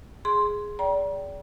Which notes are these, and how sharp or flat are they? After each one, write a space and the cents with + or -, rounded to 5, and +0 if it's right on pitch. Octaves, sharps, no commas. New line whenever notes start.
G#4 +0 C6 +0
D5 -30 G5 -15 A#5 +40